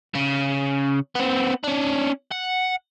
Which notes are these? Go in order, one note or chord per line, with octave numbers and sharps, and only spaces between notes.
C#3
B3 C4
C#4 D4
F#5